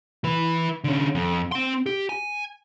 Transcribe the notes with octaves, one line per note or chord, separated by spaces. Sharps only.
E3 B4
D3 C#4
F2
C4 C6
G4
G#5